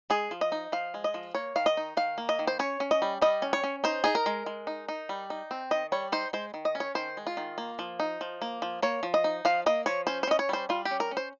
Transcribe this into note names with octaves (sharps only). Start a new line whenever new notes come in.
G#3 G#4
F3
D#5
D#4
F3 F5
G#3
D#5
F3
A#3 C#5
D#3 F5
D#5
D#4
D#3 F5
A#3
D#5
D#3
C5
C#4 C#5
C#4
D#5
G3
G3 D#5
C#4
C#5
C#4
D#4 C5
D#4 G#4
A#4
G#3
G#3
D#4
D#4
G3
D#4
C4
D#3 D#5
G3 C#5
D#4 C5
G#3 C5
D#3
D#5
C#4
C#5
D#3 C5
G#3
F4
D#3
A#3
F3
D#4
F3
A#3
F3
A#3 C#5
F3
D#5
D#4
F3 F5
A#3 D#5
F3 C#5
C#4 C5
C5
C#4 D#5
C#5
G3 C5
G3 F4
G4
C#4
A#4
C#4
C5